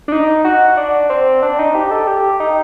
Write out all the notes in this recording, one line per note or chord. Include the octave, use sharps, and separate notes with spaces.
D4
D#4
F#4
D4
C4
D4
D#4
G4
A4
G4
D#4